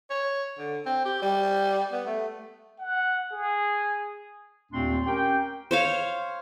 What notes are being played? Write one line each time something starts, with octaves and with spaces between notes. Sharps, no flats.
C#5
D3
C4
G4
G3
B3
A3
F#5
G#4
D#2 A#2 A3 C4 D4 C6
C#4 G4 A#4 G5
C5 C#5 F5